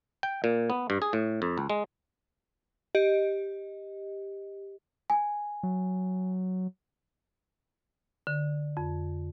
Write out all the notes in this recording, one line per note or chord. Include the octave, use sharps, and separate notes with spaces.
G5
A#2
B3
G2
G#4
A2
F2
C#2
G#3
G4 D#5
G#5
F#3
D3
F2